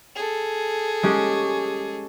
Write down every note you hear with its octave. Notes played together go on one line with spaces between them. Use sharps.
G#4 A4
G#3 C#4 G4